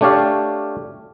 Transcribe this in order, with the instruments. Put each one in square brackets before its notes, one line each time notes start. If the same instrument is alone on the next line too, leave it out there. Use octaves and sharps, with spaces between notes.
[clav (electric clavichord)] A3 D4 G4 C#5 D5 F5